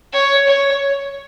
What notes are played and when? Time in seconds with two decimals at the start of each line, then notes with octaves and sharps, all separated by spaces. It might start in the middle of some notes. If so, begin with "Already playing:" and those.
0.13 C#5
0.47 C#5